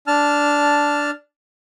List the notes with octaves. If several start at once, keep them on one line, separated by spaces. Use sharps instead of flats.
D4 A5 F6